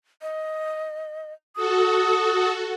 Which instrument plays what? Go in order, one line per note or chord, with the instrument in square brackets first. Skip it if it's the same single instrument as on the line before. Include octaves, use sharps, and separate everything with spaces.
[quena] D#5
[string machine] F#4 A4 [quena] D#6